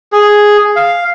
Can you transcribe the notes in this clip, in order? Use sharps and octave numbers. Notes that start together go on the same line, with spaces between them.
G#4
F5